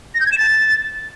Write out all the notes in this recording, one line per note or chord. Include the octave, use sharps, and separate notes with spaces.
A#6
G6
G#6
E7
A6